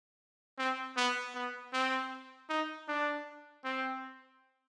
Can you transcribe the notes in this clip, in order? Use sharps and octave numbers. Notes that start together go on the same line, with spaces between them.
C4
B3
B3
C4
D#4
D4
C4